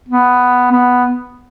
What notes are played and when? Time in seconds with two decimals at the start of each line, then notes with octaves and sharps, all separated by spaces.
0.09 B3
0.72 B3